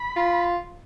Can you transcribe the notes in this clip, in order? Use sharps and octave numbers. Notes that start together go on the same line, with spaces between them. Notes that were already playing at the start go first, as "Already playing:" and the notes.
Already playing: B5
F4